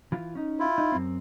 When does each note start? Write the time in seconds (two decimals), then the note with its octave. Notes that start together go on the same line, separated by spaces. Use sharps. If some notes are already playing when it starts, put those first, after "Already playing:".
0.12 E3 F4
0.35 C#4 D#4
0.59 E4 F4
0.78 D#4
0.92 F#2 C4